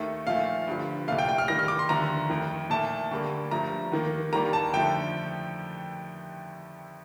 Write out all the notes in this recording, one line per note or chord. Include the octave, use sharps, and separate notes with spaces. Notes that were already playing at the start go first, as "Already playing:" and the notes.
Already playing: D#2 D#3 A3
A#2 F3 A3 F5
G2 D3 F3
C2 A#2 A3 F5
G5
G5
F6
D#2 D#3 G3 A#6
F6
D6
C6
D#2 D3 F3 A3 A#5
F2 D#3 A3
A#2 A3 A5
D2 D3 G3 A#3
G2 F3 A3 A#5
D#2 D#3 A#3
D#2 D#3 G3 A#3 A#5
A5
F2 D3 F3 A3 G5